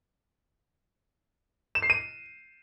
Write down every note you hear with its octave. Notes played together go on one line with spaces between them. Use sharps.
E7
C7
D#7